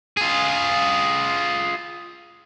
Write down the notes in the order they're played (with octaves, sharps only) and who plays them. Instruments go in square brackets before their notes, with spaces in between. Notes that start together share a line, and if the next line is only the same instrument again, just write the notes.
[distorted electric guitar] F4 G#4